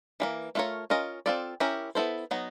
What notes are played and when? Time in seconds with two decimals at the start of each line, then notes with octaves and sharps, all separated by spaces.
0.20 E3 G3 A#3
0.55 A3 D4 F4 A#4 C#5
0.90 C#4 F4 A#4 D#5
1.26 C4 F4 A4 D5
1.60 C#4 E4 G4 A#4
1.95 B3 E4 A4 C5
2.31 F#3 B3 D#4